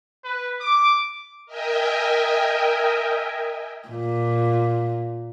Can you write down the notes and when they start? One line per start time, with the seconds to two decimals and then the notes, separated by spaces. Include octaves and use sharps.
0.24 B4
0.61 D6
1.46 A#4 D#5 E5 G5 G#5
3.88 A#2